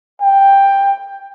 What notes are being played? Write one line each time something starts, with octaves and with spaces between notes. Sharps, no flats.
G5